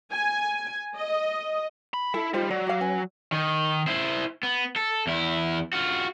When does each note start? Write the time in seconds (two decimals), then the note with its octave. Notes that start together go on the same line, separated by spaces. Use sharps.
0.12 G#5
0.97 D#5
1.94 B5
2.14 E4 A4
2.34 G3 D#4 F4 C5
2.50 F#3 D5
2.67 G4 F5
2.81 C#4 B4 G#5
3.32 D#3
3.87 E4 C5
4.43 B3
4.76 A4
5.07 E2 E4
5.73 F4 F#4